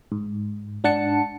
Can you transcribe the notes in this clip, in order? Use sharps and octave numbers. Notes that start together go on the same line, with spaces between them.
G#2
G#2 D4 F#5 A5 C#7